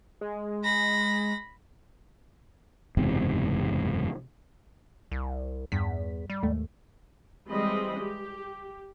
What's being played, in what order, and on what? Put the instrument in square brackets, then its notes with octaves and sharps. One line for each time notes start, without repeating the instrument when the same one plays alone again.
[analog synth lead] G#3
[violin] B5 A#6
[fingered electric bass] F#1 E2 G#2 C3
[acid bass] C2
[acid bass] E2 [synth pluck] G2 B6
[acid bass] G3
[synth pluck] D#2 G#2 A3
[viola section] E3 G3 G#3 C4 D#5 B5
G4